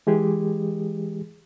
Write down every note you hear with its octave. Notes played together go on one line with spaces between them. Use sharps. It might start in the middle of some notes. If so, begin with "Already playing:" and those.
E3 G#3 G4 G#4